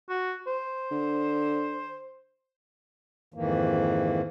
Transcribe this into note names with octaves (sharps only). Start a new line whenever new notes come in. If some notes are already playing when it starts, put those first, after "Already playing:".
F#4
C5
D3
F2 G#2 D#3 E3 A#3